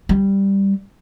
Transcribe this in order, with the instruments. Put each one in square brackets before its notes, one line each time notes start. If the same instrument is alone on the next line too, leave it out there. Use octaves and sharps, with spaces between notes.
[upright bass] G3